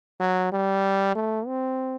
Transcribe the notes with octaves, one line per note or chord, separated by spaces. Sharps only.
F#3
G3
A3
C4